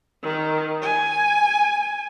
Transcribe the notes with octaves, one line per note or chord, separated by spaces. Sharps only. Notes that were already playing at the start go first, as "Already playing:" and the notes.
D#3
G#5